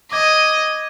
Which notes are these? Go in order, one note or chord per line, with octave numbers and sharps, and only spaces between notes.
D#5 D6 G#6 D#7